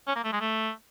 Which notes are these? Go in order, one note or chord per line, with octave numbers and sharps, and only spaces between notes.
C#4
A#3
A3
G#3
A3